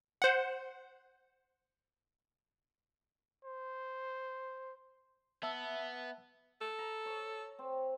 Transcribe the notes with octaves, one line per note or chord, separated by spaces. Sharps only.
C5 F#5
C5
B3 E5 A5 E6
A4
A#5
C#5
C4